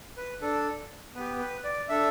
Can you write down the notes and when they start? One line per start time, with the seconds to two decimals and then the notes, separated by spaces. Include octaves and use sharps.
0.17 B4
0.42 D4 A4
1.15 B3 G4 B4
1.40 B4
1.64 D5
1.89 D4 A4 E5